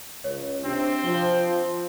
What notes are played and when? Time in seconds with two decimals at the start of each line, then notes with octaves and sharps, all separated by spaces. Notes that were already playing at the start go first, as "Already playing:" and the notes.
0.24 C#2 C#5
0.65 C3 C4 D4
1.04 F3 G7